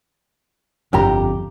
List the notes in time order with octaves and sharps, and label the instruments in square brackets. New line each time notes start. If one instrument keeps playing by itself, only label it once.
[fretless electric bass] G1 D3 [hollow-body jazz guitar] F2 G4 A#5